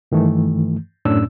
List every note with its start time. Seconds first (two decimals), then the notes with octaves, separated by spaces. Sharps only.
0.12 G2 D#3 E3 A3
1.05 F#2 A2 C#4 D4 E6